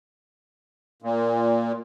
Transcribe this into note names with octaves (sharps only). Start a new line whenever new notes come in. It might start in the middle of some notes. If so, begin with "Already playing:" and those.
A#2